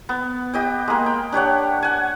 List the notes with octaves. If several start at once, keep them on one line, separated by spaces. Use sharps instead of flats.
B3
G4 D#5 G5
G#3 A#3
G5
D4 G4 C#5 F#5
F#5 G#5